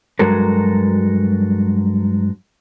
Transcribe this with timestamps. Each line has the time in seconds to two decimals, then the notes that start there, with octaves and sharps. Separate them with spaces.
0.19 G2 F#3 G#3 F#4 A4 A#4